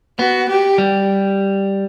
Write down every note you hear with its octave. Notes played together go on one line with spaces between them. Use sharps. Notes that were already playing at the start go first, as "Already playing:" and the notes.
B3 F#4
G4
G3